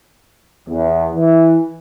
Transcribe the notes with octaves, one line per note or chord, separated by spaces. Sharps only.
E2
E3